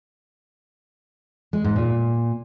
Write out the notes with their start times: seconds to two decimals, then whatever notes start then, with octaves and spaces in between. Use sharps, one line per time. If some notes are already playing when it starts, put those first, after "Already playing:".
1.53 G#3
1.64 G#2
1.76 A#2